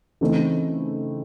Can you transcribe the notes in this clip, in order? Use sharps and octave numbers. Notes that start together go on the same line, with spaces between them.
C#3 E3 A3 C4 D#4